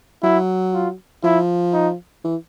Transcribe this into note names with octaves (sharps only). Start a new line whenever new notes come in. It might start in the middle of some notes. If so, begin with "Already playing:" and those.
F#3 E4
F4
F3 E4
D#4
E3